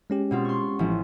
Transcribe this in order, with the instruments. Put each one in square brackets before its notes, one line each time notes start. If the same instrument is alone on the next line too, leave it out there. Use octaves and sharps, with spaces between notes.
[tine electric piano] G#3 C#4 G4
[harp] B2 C4 F4
C6 C#6
A1 F3